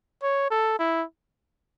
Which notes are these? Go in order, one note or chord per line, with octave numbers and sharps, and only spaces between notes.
C#5
A4
E4